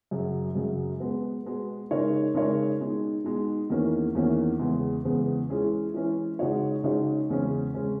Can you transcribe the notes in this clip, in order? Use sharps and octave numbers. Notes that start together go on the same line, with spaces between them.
F#2 C#3 F#3
F#2 C#3 F#3
B2 G#3 B3
B2 G#3 B3
C#3 G#3 D#4 A#4 C#5
C#3 G#3 D#4 A#4 C#5
B2 G#3 D#4
B2 G#3 D#4
E2 D#3 A#3 C#4 E4
E2 D#3 A#3 C#4 E4
E2 C#3 G#3 B3
E2 C#3 G#3 B3
E3 G#3 C#4 G#4
E3 G#3 C#4 G#4
C#3 G#3 D#4 F#4 C#5
C#3 G#3 D#4 F#4 C#5
E2 C#3 G#3 C#4
C#3 G#3 C#4